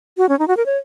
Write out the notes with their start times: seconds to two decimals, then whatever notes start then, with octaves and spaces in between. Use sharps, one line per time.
0.18 F#4
0.29 C#4
0.39 D#4
0.48 F#4
0.57 A#4
0.66 C#5